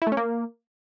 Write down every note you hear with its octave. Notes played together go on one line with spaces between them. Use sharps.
E4
A3
C#4
A#3